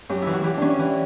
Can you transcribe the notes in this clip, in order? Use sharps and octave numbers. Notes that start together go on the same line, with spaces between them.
F#2 G4
E3 E4
F#4
E3 G4
E3 C#4 D4
E3